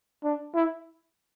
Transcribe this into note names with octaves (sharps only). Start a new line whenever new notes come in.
D4
E4